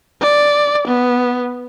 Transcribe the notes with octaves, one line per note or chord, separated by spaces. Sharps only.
D5
B3